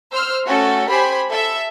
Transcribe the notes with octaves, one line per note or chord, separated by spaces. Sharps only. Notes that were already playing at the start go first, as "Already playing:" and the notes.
C5 E6 F6
A3 C#4 F#4 A4
G4 C5 G#5 B5
A4 E5